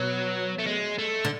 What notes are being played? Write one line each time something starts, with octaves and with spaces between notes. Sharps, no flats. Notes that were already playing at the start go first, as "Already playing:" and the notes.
Already playing: B2 F#3
A3
G#3
A3
D3